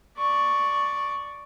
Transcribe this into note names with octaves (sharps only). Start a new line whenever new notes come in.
D5 C#6